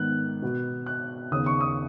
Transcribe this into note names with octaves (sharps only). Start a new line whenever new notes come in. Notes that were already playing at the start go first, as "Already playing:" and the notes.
Already playing: G#2 D#3 B3 F#6
B2 B3
F#6
D#2 C#3 B3 D#6
C#6
D#6